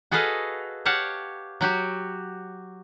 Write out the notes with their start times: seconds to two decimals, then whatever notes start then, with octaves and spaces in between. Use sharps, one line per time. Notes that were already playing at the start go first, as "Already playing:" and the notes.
0.11 F#4 G#4 A4 B4 D#5 F5
0.85 G4 C#5 F5 F#5 A5
1.61 F#3 F#4 G4